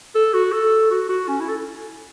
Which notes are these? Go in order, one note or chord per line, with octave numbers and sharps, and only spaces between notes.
A4
F#4
A4
F#4
F#4
C#4
E4
A4